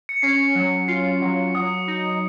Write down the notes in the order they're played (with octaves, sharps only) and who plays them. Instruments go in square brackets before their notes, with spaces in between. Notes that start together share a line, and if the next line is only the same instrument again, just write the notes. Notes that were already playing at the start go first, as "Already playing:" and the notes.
[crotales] C#7
[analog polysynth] C#4 [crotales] C7
[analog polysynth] F#3
[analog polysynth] F4 [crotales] C7
[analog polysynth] F#3
[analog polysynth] F#3 [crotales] D#6
[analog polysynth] D#4